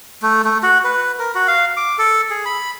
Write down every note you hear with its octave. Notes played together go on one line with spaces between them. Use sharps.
A3
A3
F#4
B4
A#4
F#4
F5
D6
A4
G#4
B5